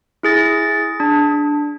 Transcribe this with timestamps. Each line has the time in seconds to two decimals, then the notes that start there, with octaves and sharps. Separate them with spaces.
0.23 E4 G#4 A6 A#6
1.00 D4